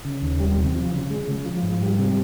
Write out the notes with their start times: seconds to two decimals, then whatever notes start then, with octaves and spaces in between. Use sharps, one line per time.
0.05 C#3
0.22 D#2
0.40 G3
0.57 C3
0.75 F3
0.93 C#3
1.10 G#3
1.28 C#3
1.45 F3
1.63 G#2
1.81 G3
1.99 C3